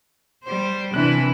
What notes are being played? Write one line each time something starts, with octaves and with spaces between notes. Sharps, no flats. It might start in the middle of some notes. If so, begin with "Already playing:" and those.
G3 C5
C3 E3 D4 E4 F#6